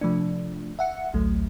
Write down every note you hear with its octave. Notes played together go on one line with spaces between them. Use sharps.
C3 F3 A3 D4
E5 F#5 C#7
A1 D2 F#3 A3